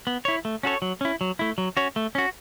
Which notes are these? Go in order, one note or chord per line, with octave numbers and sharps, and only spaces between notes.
B3
E4 C#5
A3
C#4 F#4 A4 C#5
F#3
C#4 E4
F#3
A3 E4
F#3
C#4 F#4 C#5
A3
C#4 F#4